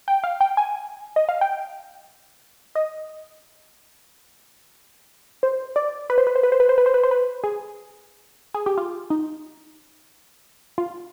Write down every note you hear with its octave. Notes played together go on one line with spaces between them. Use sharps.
G5
F5
G5
G#5
D#5
F5
G5
D#5
C5
D5
B4
C5
B4
C5
B4
C5
B4
C5
B4
C5
B4
C5
B4
G#4
G#4
G4
F4
D#4
F4